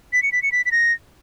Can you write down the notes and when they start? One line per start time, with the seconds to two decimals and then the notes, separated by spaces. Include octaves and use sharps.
0.13 B6
0.23 C#7
0.32 B6
0.43 C#7
0.52 B6
0.66 B6
0.72 A#6